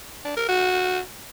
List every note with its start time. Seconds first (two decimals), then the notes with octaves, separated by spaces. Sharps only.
0.25 D4
0.37 A#4
0.49 F#4